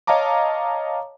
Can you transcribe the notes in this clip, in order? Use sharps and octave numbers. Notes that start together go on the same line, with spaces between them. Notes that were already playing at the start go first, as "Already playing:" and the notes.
C#5 D#5 F5 A5 A#5 D6